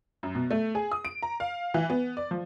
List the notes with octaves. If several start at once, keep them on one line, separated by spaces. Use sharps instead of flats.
F#2
B2
A3
G#4
D#6
D7
A#5
F5
E3
B3
D5
F3